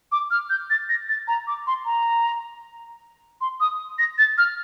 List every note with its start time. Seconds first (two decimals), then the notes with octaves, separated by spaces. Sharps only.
0.12 D6
0.31 F6
0.50 G6
0.70 A6
0.89 A#6
1.09 A6
1.28 A#5
1.47 D6
1.67 C6
1.85 A#5
3.41 C6
3.60 D#6
3.99 A#6
4.18 A6
4.38 F6